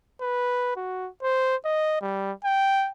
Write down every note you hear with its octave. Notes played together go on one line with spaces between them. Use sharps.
B4
F#4
C5
D#5
G3
G5